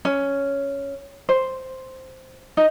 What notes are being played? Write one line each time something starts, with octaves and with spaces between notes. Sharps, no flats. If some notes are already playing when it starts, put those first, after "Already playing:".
C#4
C5
D#4